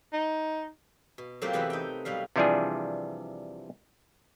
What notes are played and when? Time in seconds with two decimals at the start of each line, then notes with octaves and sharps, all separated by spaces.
0.13 D#4
1.18 B2
1.42 F#3 A3 A#3 C4 F4 G4
1.53 E2 C3 E3 E4 B4 F#5
1.70 D#4 G5
2.05 B2 F#3 G3 F5
2.36 C3 E3 F3 G3 D4 G#4